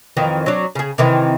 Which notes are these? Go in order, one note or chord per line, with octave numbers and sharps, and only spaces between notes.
F2 D#3 E3
F#3 D4
C#3 G#4
C3 D#3 E3